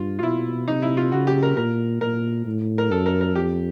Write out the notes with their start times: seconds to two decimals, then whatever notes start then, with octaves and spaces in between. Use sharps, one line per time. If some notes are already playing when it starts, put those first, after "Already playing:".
Already playing: G2 F4
0.19 F4
0.23 B2 E4
0.68 C3 D#4
0.82 E4
0.97 F4
1.12 C#3 F#4
1.27 G4
1.43 A#4
1.57 A#2 A#4
2.01 A#2 A#4
2.46 A2
2.78 A#4
2.91 F#2 A4
3.06 A#4
3.21 A#4
3.35 F2 G4